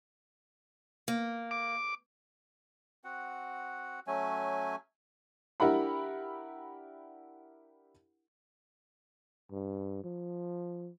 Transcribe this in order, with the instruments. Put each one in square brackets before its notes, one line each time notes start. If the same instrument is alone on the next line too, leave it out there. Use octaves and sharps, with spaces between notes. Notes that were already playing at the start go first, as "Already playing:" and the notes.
[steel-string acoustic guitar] A#3
[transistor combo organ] D6
[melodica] C4 F#4 F#5
F#3 A3 C#4 G#5
[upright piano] D4 E4 G4 A#4 F#5 B5
[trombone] G2
F3